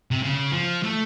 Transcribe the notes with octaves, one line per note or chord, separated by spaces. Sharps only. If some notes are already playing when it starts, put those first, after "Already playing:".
C3
C#3
F3
A3